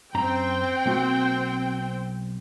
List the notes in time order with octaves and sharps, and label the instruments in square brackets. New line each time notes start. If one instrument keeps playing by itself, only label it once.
[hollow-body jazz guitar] F#2 A#5 [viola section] C4 G5
[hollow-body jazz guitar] B1 A#3 F#4